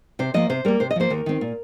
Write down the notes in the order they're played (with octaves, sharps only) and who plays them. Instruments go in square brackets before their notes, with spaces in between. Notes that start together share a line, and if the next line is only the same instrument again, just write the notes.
[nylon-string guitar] C3 C5
F3 A#3 D#5
C3 C5
G3 A#3 A#4
C3 C5
D#5
F3 A#3 C5
D#2 A#4
D#3 C4
A#2